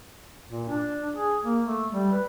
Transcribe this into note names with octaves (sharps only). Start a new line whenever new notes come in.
A#2
D4
G#4
A#3
A3
G3
B4